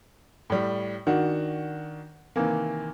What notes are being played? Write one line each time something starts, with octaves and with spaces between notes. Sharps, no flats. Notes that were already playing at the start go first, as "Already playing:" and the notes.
A2 G3
D#3 D4 F#4
C3 D#3 E3 A#3